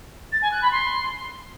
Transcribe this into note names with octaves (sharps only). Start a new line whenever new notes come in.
A6
G#5
F#6
B5
C6